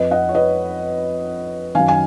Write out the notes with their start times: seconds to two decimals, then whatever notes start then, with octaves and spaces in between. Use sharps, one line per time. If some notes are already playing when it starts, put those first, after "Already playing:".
Already playing: F2 F3 B4 D#5
0.11 D#5 F#5
0.29 C#5
0.35 B4 D#5
1.75 F#2 D#3 F5 G#5
1.88 G#5